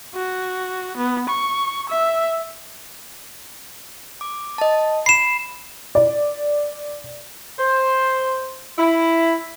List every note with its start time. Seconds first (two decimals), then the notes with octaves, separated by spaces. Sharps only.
0.15 F#4
0.97 B3
1.29 C#6
1.89 E5
4.21 D6
4.58 D#5 A5
5.06 B5 C7 E7
5.95 D5
7.59 C5
8.78 E4